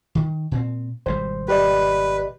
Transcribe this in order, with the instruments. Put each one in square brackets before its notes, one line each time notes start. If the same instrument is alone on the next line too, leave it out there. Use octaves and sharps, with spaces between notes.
[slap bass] D#3
A#2 C4
[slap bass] G#1 B2 G3 [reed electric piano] C5
[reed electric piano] G4 D5 D#5 [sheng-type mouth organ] B4